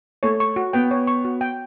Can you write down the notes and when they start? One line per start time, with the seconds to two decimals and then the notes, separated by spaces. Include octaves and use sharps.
0.23 A3 C#5
0.40 C#6
0.56 F#4
0.73 B3 G5
0.91 C#5
1.07 C#6
1.25 F#4
1.41 G5